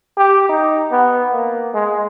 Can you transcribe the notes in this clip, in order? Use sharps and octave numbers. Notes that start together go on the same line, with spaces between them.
G4
D#4
B3
A#3
G#3